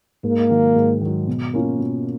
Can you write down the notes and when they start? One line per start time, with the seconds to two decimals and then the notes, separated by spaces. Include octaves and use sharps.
0.23 G#2 A#3
0.50 D#3 F#3
0.76 G#2
1.01 D#3 F#3
1.27 B2
1.53 A#3 C#4 F4
1.79 B2